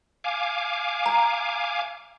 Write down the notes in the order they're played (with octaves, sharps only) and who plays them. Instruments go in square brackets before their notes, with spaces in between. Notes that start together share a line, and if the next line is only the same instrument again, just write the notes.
[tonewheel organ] F5 G#5 D6
[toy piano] A#5